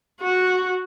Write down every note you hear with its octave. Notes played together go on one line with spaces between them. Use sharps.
F#4